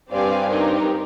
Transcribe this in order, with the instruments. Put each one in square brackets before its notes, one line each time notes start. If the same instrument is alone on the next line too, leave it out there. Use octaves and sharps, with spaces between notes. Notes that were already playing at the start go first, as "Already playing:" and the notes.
[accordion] G2 [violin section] C4 G4 D5 F5 G#5
[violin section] C4 D#4 G4 A#4